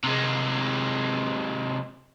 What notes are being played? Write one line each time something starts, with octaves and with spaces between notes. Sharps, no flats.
C3 G#3